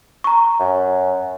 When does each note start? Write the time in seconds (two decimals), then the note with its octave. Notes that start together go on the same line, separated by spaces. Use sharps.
0.24 A#5 C#6
0.60 F#2